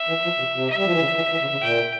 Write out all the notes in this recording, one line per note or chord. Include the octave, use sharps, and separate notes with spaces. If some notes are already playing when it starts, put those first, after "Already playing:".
Already playing: E5
E3
F3
C3
C3
E5
G3
F3
E3
C#3
E3
E3
C#3
C#3
A#2 G5